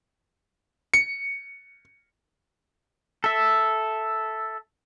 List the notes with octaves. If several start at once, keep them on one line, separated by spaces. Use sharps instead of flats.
C#7
A4 E5